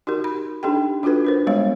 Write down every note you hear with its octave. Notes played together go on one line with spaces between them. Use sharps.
D#4 F#4 G4 A#4
B5
D4 D#4 G4 A4 G5
D4 F4 F#4 A4 B4
D4 A#4 C5
G3 G#3 B3 C#5 F5